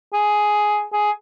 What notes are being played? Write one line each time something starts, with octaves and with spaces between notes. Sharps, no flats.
G#4
G#4